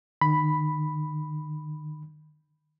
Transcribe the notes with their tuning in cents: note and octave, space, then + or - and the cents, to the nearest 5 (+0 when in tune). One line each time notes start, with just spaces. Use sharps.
D#3 -35 B5 +0